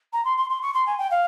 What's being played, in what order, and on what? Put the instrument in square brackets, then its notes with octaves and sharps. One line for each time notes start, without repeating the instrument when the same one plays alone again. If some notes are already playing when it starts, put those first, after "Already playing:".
[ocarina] A#5
C6
C6
C6
C#6
C6
G#5
G5
F5